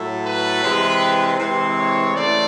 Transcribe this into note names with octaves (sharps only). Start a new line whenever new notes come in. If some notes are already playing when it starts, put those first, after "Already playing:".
Already playing: A2 F#3 A3
B4
C3 E3 G#3 C4
C3 E3 G#3 C4 C5
C#5
C#3 E3 A3 C4 D5